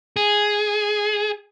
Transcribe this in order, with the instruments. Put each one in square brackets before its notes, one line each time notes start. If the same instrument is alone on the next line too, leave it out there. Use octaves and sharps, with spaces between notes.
[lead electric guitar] G#4